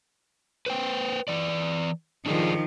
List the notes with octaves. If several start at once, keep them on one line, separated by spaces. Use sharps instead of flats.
B4 C5 G5
E3 D5
D#3 F3 D4 D#4 G#4